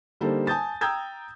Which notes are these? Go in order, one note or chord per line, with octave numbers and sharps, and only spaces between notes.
D3 G3 A#3 D#4 A4 C5
G#5 A5 D#6 G6 A6
G5 A#5 D#6 E6 G6 G#6